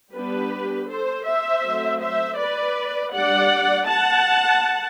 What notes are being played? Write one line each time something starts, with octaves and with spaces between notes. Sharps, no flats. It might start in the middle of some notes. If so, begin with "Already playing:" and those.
G3 B3 D4 G4 B4
A4 C5
C5 E5
F#3 A3 C4
C5 E5
B4 D5
G3 D4 D5 F#5
F#5 A5